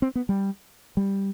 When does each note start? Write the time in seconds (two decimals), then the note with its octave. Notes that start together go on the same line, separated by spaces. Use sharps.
0.02 C4
0.15 B3
0.29 G3
0.97 G3